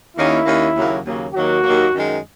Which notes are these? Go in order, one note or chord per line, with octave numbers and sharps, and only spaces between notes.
D#2 D#3 A#3 C#4 E4
D#2 D#3 A#3 C#4
D#2 C#3 F#3 A#3
D#2 C#3 F#3 A#3
D#2 D#3 F#3 A#3 F#4
D#2 D#3 F#3 A#3
F#2 D#3 G#3